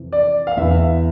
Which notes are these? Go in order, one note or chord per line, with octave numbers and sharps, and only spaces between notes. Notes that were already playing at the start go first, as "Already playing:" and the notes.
Already playing: F2 C3 E3
D5
F5
E2 E3 E5
F5
E5